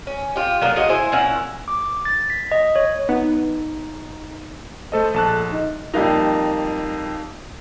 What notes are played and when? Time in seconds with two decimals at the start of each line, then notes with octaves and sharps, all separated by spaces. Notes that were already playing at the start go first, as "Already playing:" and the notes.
0.07 C#4
0.36 F4 G4
0.61 F#3 A#3 B3 D4
0.76 F#3 G#3 F#4 D#5
0.89 E4 C5 G#5
1.12 A#2 C#4 E4 F#5
1.68 D6
2.05 A6
2.30 B6
2.52 D#5
2.76 C#5
3.09 B3 D#4
4.92 A3 A4 C5 D#5
5.14 A#1 A4 A5 F#6
5.51 D#4
5.94 F2 G3 A#3 D#4